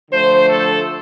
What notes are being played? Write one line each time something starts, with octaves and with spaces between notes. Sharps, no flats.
D3 F3 A3 C5
A4